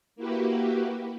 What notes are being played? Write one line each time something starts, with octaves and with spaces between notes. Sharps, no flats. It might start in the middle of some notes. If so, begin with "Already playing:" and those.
A#3 E4 F#4 G4 B4